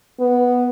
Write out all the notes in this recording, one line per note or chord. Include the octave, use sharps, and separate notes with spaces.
B3